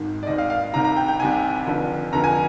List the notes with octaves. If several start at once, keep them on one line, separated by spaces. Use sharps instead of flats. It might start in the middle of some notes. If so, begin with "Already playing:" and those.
Already playing: G#1 G#2 D#3
D5
G#1 G#2 D#3 D#5
F5
F5
C2 C3 D#3 A#5
A#5
G5
G5
C2 C3 D#3 G#5
F1 F2 D3
F1 F2 D3 A#5
G#5